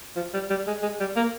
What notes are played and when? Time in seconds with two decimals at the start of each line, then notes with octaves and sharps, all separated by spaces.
0.16 F3
0.34 G3
0.50 G3
0.67 G#3
0.83 G#3
1.00 G3
1.16 A#3